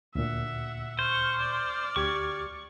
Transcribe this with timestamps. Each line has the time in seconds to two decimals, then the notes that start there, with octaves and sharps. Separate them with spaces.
0.15 D2 A#2 E5 F#5
0.99 C5 C#6 F6
1.38 D5 F6
1.96 D2 G4 C#6 G#6